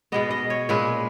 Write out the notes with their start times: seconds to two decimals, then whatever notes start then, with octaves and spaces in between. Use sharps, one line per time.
0.12 B2 G#3 B3 D#5
0.31 D#5
0.50 C#5
0.69 A#2 G#3 C#4 B4